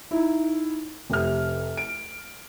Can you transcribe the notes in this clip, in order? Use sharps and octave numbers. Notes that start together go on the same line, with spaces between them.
D#4 E4
F1 C3 F6
D7